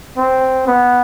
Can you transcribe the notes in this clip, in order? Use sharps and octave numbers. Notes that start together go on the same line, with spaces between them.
C4
B3